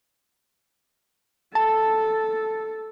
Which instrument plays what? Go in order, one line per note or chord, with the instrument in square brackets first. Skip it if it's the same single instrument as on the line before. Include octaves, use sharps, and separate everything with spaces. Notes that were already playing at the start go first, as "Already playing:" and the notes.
[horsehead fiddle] A4 [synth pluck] A5